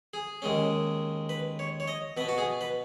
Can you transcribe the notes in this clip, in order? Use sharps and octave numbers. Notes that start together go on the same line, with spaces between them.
G#4
D#2 D#3 G#3 C#4
B4
C#5
C#5
D#5
B2 B3 B4
F#4
G#4
B4